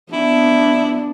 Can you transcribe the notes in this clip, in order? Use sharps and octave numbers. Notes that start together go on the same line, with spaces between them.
B3 D4 E4